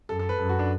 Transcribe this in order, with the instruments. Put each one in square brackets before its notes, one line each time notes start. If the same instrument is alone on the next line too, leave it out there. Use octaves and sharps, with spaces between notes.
[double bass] F#2 [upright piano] A4
[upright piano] A4
B4
[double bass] F#2 [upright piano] A4
[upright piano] F#4
D4